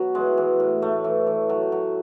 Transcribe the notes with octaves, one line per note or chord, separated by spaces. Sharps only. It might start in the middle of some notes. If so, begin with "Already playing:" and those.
Already playing: B2 F#3
E3 G#3
E3
A2
A2 A3
E3
E3
F#3
F#3